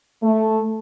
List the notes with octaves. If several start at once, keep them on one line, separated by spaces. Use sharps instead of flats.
A3